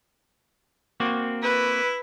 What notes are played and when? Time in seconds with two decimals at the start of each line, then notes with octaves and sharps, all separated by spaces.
1.00 A#3 C4 F#4
1.43 E4 B4